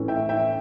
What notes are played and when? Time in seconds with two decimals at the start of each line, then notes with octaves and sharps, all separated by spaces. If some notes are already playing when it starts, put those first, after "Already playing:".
Already playing: A2 E3 A3 C#4
0.08 E5 G5
0.29 E5 G5